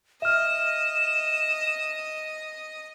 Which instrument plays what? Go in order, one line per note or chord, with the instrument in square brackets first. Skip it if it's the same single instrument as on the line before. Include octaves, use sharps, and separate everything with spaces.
[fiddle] D#5 [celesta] E5 F6 [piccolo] E7